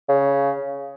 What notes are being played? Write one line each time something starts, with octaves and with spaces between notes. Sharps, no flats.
C#3